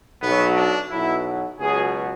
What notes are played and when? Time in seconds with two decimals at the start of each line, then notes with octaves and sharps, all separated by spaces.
0.21 B1 B2 F#3 B3
0.56 D4
0.90 B1 B2 F#3 E4
1.59 C#2 B2 F#3 G#4